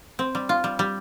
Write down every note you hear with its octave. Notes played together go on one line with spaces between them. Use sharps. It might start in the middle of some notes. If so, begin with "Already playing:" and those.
C4
G3
F4
G3
G3